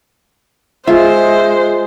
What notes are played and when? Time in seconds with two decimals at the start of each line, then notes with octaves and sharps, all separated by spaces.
0.87 G#3 F4 C5 E5